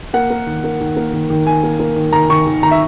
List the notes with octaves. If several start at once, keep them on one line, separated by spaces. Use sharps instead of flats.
A#3 F#5
A#3
D#3
A#3
D#3
A#3
D#3
D#3
D#3 G#5
A#3
A#3
D#3
D#3 A#5
D#3 C#6
D#3
D#3 A#5
E5